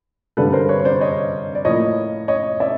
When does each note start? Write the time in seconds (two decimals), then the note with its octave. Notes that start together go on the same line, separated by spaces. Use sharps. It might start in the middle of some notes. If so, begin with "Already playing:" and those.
0.37 G2 D3 G3 A4 B4
0.53 A#4 C5
0.69 B4 C#5
0.79 C#5
0.85 C5 D5
1.01 C#5 D#5
1.55 D5
1.65 A2 F3 A#3 C#5 D#5
2.28 C#5 D#5
2.60 D5 E5